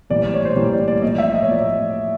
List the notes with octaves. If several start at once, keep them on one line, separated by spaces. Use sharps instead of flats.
A2 E3 G3 A#3 D5
D5
C#5
C5
A2 E3 G3 A#3 C#5
D5
D5
A2 F3 A#3 D#5
E5
D#5
C#5
A2 F3 A#3 D5